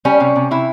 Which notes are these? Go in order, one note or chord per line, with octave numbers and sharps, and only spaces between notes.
G3 C#4
C3
C3
C3 E4